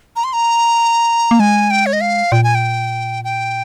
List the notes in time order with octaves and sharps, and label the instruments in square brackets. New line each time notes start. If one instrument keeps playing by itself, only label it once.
[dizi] A#5
C6
A#5
[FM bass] A#3
[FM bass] G#3 [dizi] G#5
[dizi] G5
C#5
D#5
F5
[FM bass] A#2 [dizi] G5
[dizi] G#5
G5
G5